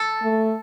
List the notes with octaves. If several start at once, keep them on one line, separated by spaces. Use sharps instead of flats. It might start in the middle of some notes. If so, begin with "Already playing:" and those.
Already playing: A4
A3